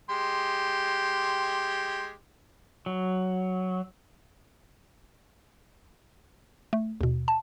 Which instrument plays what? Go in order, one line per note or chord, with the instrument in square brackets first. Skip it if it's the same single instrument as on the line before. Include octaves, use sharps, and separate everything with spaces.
[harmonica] G#3 G4 C6
[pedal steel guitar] F#3
[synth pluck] A3
D#2 B2
A5